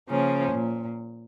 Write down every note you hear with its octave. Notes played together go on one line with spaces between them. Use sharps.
C#3 F3 A#3 C#4
A#2